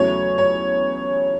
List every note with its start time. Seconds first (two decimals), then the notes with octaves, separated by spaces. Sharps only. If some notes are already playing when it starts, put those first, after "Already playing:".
Already playing: E2 C#3 F#3 A3 C#5
0.38 C#5